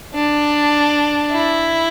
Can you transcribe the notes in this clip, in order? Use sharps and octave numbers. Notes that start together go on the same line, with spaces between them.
D4
E4